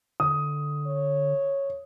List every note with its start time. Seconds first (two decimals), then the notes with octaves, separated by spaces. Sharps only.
0.20 D3 D#6
0.87 C#5